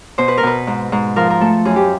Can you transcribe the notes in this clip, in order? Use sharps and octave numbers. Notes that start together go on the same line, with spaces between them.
B2 C5
B4
A#4
B2 B4
G#2
G#2
F3 A#4
A#4
A3 A4
F#2 G#4
G4